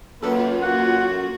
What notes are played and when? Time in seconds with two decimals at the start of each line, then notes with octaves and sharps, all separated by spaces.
0.22 F#2 A#3 F4 A4 B4
0.62 F#4 F#5